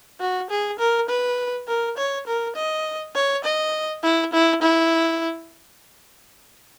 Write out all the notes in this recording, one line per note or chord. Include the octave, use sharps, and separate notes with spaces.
F#4
G#4
A#4
B4
A#4
C#5
A#4
D#5
C#5
D#5
E4
E4
E4